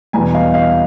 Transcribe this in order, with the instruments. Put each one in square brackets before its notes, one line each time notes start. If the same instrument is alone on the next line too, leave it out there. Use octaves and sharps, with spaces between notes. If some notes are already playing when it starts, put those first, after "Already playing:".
[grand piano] E2 B2 G3 [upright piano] G#5 A#5
[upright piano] D#5 F5
D#5 F5